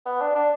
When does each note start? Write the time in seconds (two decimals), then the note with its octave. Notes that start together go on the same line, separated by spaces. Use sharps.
0.06 B3
0.21 D4
0.35 D4